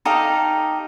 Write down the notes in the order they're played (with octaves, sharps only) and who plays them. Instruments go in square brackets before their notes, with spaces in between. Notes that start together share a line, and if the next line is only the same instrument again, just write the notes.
[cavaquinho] D#4 G4 A4 F5